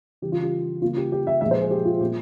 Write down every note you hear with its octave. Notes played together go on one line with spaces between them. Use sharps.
C#3 E3 G3 G4
F4
G4
C#3 G3 A#3 F4
G4
G4
E5
A#2 F3 G#3 E5
C5
G#4
G4
F4
A#2 G3 A#3 G4